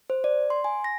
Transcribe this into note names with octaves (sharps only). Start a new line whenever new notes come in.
C5
D5
C6
G#5
A#6